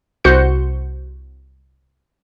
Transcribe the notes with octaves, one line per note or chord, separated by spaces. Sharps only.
C2 F#4 C5 G6 C#7